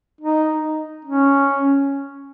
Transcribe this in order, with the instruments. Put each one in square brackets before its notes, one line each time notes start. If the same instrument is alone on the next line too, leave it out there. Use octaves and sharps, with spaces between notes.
[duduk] D#4
C#4